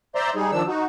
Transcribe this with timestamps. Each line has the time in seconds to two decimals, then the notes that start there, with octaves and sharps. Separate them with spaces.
0.15 C5 D5 E5 A#5 C6
0.36 G3 D#4 G#4
0.52 D#3 F3 D4 E6
0.68 D#4 F#4